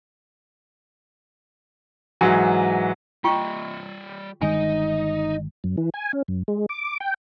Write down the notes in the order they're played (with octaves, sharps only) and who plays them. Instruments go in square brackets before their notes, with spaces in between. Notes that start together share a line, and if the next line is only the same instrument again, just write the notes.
[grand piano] G#2 E3 F#3
[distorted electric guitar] G3 D#5 [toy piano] F4 G5 C#6
[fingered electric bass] G1 D#3 G#3 [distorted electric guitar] D#4 [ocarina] D#5 [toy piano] G#5
[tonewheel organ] F#2
E3
G#5
C#4
F#2
G#3
D6
G5